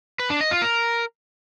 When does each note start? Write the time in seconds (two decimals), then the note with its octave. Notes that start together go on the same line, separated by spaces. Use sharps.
0.20 B4
0.30 D4
0.41 D#5
0.51 F4
0.62 A#4